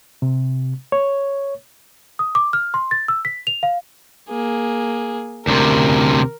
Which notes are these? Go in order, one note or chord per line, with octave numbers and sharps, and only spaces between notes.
C3
C#5
D#6
D6
F6
C6
A6
E6
B6
F7
F5
A#3 G#4
D2 C3 A#4